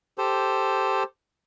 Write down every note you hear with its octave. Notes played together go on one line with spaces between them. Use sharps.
G4 A4 C5